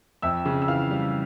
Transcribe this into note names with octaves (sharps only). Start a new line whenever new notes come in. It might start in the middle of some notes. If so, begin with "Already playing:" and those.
F2 E5 E6
C#3
E6
E3 F5 F6
G3